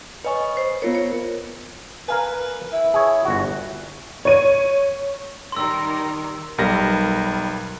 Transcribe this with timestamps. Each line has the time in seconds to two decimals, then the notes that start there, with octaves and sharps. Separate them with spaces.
0.25 B4 C#5 D#5 G#5 C#6
0.57 C5
0.82 B3 F4 A#4 C#5
0.95 C#5
2.08 A#4 B4 F5 G#5
2.72 E4
2.94 G#4 C#5
3.25 G1 F#4
4.25 C#5 D#7
5.52 D#3 G3 A#4 C6 E6
6.58 B1 G3 A#4 A#6